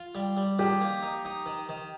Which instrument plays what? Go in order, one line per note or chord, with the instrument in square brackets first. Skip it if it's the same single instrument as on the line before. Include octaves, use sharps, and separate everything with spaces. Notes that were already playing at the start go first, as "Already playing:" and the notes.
Already playing: [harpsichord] F4
G3
G3
[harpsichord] D#3 [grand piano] G4
[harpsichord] A#3
D#4
D#4
D#3
D#3